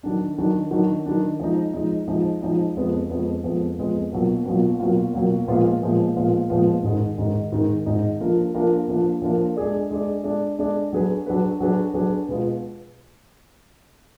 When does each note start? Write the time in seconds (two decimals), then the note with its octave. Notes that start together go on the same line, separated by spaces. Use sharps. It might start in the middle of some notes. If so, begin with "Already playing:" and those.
0.03 D#3 F#3 D4
0.38 D#3 F#3 D4
0.71 D#3 F#3 D4
1.06 D#3 F#3 D4
1.40 F3 G#3 D#4
1.74 F3 G#3 D#4
2.08 F3 G#3 D#4
2.42 F3 G#3 D#4
2.76 F2 F3 G#3 B3
3.10 F2 F3 G#3 B3
3.44 F2 F3 G#3 B3
3.78 F2 F3 G#3 B3
4.12 B2 F#3 A#3 F4
4.46 B2 F#3 A#3 F4
4.80 B2 F#3 A#3 F4
5.14 B2 F#3 A#3 F4
5.48 A#2 F3 G#3 B3 F4
5.82 A#2 F3 G#3 B3 F4
6.16 A#2 F3 G#3 B3 F4
6.50 A#2 F3 G#3 B3 F4
6.83 G#2 D#3 G#3 D#4
7.18 G#2 D#3 G#3 D#4
7.52 G#2 D#3 G#3 D#4
7.86 G#2 D#3 G#3 D#4
8.20 F3 A#3 D4 F4 A#4
8.54 F3 A#3 D4 F4 A#4
8.88 F3 A#3 D4 F4 A#4
9.22 F3 A#3 D4 F4 A#4
9.56 G#3 D4 G#4 D5
9.90 G#3 D4 G#4 D5
10.24 G#3 D4 G#4 D5
10.58 G#3 D4 G#4 D5
10.93 F#3 D4 G#4 B4
11.26 F#3 D4 G#4 B4
11.60 F#3 D4 G#4 B4
11.94 F#3 D4 G#4 B4
12.28 B2 G#3 B3 F4